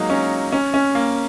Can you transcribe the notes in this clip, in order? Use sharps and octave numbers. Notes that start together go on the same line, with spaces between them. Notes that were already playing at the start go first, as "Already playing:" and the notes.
Already playing: F#3 G#3 A#3 D#4
C#4
C#4
C#4
A#3